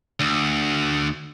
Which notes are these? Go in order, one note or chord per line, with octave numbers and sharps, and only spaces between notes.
D2